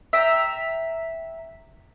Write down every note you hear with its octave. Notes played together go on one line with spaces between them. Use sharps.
E5 G5 A#5